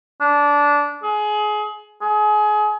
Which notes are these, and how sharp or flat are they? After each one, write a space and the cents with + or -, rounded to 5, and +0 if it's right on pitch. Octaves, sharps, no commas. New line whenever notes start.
D4 -15
G#4 +25
G#4 +30